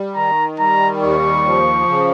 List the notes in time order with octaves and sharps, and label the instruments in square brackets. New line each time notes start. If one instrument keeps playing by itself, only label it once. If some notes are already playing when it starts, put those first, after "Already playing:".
Already playing: [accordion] G3
[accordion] D#3 [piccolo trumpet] A#5
[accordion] G3 [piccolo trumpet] A#5
[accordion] D#2 [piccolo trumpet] C#6
[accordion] F3
C#3